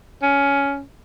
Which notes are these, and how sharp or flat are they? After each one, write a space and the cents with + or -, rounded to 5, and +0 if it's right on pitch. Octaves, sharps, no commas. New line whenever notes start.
C#4 +15